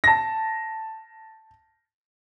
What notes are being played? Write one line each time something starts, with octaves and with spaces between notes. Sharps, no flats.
A5 A#6